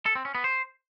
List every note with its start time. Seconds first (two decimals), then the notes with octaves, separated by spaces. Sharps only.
0.06 A4
0.15 C4
0.25 C#4
0.35 B3
0.44 C5